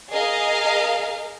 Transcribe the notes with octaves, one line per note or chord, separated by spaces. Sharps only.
G#4 A#4 D#5 F5